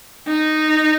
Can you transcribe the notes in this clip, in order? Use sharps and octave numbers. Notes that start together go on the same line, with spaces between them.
D#4